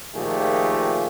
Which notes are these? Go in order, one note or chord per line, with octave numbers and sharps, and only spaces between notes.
A#2 D#3 F3 A3 G4 G#4